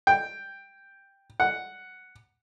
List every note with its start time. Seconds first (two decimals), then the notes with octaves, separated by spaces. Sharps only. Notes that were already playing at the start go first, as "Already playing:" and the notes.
0.07 G5
1.40 F#5